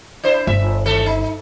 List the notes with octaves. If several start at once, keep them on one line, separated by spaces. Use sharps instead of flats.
D4 E4 C5
G1 E5
D#3 A3 A4
D#4